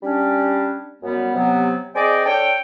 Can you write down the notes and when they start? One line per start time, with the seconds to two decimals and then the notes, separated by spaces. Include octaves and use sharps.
0.03 G3 C#4 D4
1.03 F#2 G3 B3
1.34 C3 F#3 B3
1.95 C4 G#4 D5 D#5 G5 G#5
2.25 D4 A4 C#5 G5